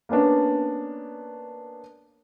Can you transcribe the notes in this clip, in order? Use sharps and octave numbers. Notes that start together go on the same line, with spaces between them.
A#3 B3 C#4 D4